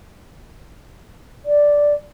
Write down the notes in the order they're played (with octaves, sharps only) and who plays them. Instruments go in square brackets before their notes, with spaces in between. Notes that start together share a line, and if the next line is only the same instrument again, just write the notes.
[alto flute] D5